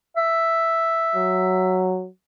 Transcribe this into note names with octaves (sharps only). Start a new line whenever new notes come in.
E5
F#3